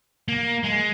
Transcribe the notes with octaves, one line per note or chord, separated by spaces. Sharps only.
A#3
G#3